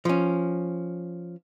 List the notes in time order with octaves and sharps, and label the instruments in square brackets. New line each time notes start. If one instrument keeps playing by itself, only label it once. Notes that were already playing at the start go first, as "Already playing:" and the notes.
[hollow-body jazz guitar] F3 C#4